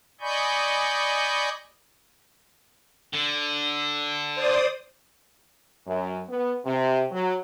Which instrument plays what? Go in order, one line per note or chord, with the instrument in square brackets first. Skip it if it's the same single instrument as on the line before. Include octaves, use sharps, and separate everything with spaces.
[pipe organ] D5 D#5 G#5 B5 C#6 G6
[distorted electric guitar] D3
[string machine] C5 D5 D#6
[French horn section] F#2
B3
C3
F#3